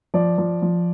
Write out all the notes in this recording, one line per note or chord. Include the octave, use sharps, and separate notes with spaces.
F3 D5
F3
F3